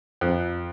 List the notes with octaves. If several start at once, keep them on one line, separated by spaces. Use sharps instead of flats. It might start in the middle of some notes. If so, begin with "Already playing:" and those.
F2